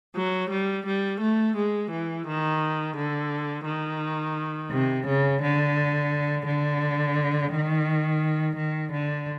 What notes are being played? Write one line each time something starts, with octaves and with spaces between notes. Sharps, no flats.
F#3
G3
G3
A3
G#3
E3
D#3
D3
D#3
C3
C#3
D3
D3
D#3
D#3
D3